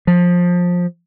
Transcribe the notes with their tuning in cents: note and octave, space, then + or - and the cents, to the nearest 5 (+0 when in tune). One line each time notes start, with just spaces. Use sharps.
F3 +20